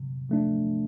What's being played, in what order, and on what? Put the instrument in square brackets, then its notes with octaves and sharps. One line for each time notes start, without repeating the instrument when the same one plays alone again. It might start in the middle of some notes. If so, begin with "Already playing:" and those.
Already playing: [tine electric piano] C3
F3 A3 D4